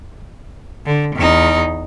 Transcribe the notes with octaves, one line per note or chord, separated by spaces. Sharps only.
D3
E2 D#4